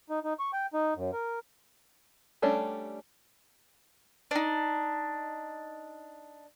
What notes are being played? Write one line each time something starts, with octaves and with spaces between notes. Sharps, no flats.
D#4
D#4
C#6
G5
D#4
F#2
A#4
G3 A3 C#4 D4 A4
D4 D#4